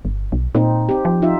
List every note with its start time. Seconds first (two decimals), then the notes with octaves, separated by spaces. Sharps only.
0.05 G1
0.32 B1
0.55 A#2 C4 D#4
0.89 C4 G4
1.05 F3
1.22 D#4 F4 E5